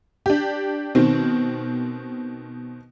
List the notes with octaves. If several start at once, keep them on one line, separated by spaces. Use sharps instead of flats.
D4 G4
B2 D#3 C4